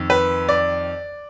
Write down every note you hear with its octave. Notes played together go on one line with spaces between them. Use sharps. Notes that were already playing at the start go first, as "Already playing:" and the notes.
Already playing: F2 D#3
B4
D5